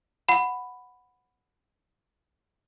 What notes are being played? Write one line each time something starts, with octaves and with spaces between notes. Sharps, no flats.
F#5 B5